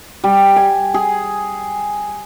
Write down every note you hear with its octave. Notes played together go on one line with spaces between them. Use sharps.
G3
G#5
G#4